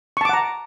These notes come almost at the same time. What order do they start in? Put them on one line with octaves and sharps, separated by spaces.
C#6 A5 D6 F#5 A#5